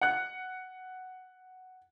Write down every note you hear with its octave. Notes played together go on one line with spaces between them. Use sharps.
F#5 F#6